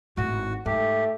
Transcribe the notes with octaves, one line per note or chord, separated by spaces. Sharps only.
G#1 A2 F#4
G#2 A3 G4